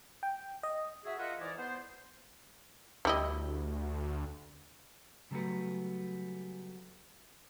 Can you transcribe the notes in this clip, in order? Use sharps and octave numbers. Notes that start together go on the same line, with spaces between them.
G5
D#5
F#4 G#4 E5
F4 A#4 D#5 E5 F#5
G#2 E3 E4 G#4 A#4 D5
B3 C5
D2 G3 E4 D#5
C#3 F#3 G3 A3 B3